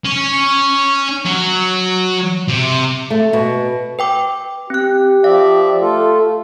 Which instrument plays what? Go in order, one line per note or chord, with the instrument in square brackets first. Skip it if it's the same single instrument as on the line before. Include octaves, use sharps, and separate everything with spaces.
[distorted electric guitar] C#4
F#3
C3
[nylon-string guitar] A3
B2
[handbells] B4 G5 D6
[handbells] C4 F#6 [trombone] G4
[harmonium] F3 D5 E5 [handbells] F5
[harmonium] A3 F4 A4